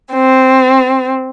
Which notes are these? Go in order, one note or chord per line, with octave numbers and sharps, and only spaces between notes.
C4